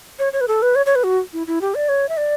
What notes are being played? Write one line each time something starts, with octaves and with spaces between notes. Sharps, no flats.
C#5
C#5
B4
A4
B4
C#5
C#5
B4
F#4
E4
E4
G4
D5
C#5
E5
D5